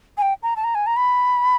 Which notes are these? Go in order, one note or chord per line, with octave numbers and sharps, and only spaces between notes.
G#5
G5
A#5
A5
A#5
G#5
A#5
B5